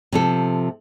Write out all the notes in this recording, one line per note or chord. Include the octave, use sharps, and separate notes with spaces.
C3 F3 A4